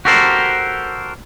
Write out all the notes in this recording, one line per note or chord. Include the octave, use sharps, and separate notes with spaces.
F#4 G4 A4 A#4 C5